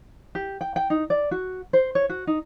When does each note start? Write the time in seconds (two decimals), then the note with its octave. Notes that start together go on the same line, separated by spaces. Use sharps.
0.35 G4
0.61 G5
0.76 G5
0.90 D#4
1.10 D5
1.31 F#4
1.73 C5
1.95 C#5
2.09 F#4
2.27 D#4